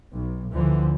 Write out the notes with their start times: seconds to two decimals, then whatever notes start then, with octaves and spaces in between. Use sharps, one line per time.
0.12 B1
0.53 D2 D3 E3 F3